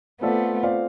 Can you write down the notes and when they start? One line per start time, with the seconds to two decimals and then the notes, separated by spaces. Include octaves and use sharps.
0.21 A3 B3 C4 F4 A4 D5 F5
0.63 C4 F4 A4 D5 F5